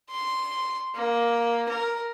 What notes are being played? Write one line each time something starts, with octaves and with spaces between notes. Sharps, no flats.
C6
A#3
A#4